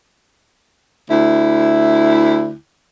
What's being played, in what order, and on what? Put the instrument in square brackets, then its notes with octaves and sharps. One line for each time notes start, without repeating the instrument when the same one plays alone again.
[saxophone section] D2 E4